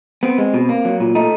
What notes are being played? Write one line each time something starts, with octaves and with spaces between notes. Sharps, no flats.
B3 C4
G#3
B2
A#3
F#3
A#2
A3 D#4